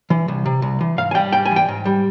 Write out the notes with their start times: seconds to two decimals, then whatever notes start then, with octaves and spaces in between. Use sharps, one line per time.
0.10 E3
0.28 C2
0.46 C3
0.62 C2
0.81 E3
0.98 G#2 F5
1.11 G#5
1.15 G3 G5
1.33 G#2 G5
1.45 G#5
1.51 E3
1.56 G5
1.68 G#2
1.85 G3